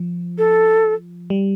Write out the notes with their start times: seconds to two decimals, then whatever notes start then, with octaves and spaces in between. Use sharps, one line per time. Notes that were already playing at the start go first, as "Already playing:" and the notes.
Already playing: F3
0.38 A4
1.30 G3